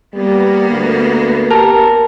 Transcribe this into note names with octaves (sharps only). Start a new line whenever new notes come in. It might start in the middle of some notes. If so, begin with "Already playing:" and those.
G3 A#3 B3
D2
G4 A#4 A5